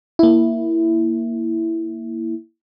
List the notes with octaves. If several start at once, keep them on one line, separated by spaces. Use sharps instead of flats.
A#3 E4